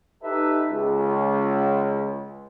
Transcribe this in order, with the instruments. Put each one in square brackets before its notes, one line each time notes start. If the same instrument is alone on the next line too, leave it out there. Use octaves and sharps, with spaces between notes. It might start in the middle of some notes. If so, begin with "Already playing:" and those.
[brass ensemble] D#4 G4 A4 B4 E5
C#2